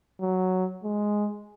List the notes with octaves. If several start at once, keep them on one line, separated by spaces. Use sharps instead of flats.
F#3
G#3